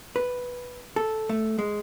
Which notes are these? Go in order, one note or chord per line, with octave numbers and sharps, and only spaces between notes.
B4
A4
A3
G#3